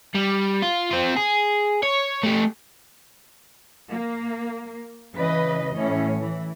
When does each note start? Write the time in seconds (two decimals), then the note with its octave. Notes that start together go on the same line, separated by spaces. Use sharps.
0.15 G3
0.62 F4
0.91 C4 F4
1.16 G#4
1.83 C#5
2.24 A3 G4
3.90 A#3
5.16 C#3 E3 B4 D#5
5.75 A2 E3 C#4
6.20 E3